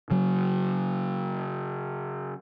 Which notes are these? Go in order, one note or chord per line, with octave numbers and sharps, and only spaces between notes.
C#3 F#3